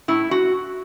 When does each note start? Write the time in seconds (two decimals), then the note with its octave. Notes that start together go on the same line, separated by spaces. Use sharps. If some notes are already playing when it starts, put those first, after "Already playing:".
0.08 A2 E4
0.31 F#4